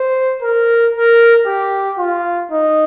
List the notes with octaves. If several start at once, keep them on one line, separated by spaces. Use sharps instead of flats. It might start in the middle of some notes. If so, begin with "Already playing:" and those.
Already playing: C5
A#4
A#4
G4
F4
D#4